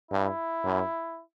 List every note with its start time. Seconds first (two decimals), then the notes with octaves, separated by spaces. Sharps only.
0.11 G2 E4
0.64 F#2